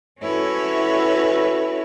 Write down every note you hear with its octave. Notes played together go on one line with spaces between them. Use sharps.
C#4 E4 F#4 A4 B4 C#5